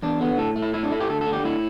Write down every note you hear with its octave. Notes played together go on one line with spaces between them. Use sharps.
E2 D4
D3 B3
A2 A4
A3
E4
A2 E4
D4
A3 E4
G4
D2 A4
A4
D3
G4
A2 E4